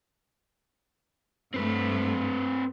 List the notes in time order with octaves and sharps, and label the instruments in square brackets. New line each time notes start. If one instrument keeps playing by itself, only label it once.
[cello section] G2 A3 [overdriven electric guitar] C4 B4